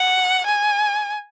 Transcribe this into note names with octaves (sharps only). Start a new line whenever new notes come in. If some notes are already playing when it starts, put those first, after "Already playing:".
Already playing: F#5
G#5